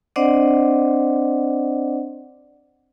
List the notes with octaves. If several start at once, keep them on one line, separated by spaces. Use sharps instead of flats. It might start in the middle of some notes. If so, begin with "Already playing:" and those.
C4 D4 C5 D5 D#5 F#5